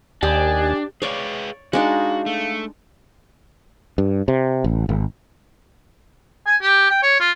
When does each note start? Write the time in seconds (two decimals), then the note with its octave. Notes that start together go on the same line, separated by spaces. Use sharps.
0.23 D#2 D4 G4 D#5 G#5
1.02 G#4 B4 C#5 D5 F5
1.73 G#3 D4 D#4 F#4 F5
2.26 A3
3.98 G2
4.28 C3
4.64 A1
4.89 G#1
6.46 G#5
6.61 G4
6.90 G5
7.03 C#5
7.20 F4